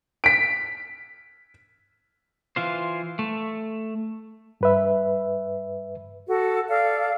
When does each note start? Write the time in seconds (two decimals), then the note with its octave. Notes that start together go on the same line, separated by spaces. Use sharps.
0.24 B6 D7
2.56 E3 F4 C5
3.19 A3
4.61 G2 B4 E5
6.26 F#4 A4
6.68 A4 D5 F5